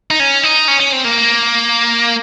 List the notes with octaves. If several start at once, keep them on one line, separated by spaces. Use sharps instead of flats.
D#4
C#4
D#4
C#4
C#4
C4
A#3